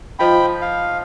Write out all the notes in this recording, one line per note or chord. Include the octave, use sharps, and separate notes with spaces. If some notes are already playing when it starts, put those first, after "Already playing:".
F3 D#4 G5 B5
F5